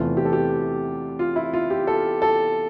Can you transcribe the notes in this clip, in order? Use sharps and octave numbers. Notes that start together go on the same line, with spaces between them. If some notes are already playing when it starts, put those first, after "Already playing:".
Already playing: E2 C3 E3 A3 F4
G4
A4
G4
F4
E4
F4
G4
A4
A4